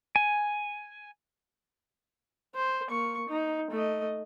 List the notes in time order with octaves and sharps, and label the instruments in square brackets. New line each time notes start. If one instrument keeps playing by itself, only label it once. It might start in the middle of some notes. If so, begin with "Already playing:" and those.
[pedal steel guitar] G#5
[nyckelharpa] C5
A#3 C#6
D#4
A3 D#5